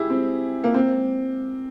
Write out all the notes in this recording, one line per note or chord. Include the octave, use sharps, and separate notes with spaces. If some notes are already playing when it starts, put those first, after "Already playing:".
Already playing: E4 G4 G#4
C4
A#3
C4